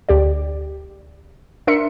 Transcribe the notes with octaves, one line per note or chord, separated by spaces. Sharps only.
D2 G4 D5
D4 A#4 E5 C6 C#7